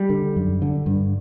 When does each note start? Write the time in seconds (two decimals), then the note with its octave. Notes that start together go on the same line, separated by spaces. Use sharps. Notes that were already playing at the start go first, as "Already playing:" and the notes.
Already playing: G3
0.10 D3
0.36 F#2
0.62 D3
0.86 G2